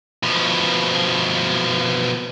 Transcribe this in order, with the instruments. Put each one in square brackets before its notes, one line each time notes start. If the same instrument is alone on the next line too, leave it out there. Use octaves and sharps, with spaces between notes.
[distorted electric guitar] B2 F3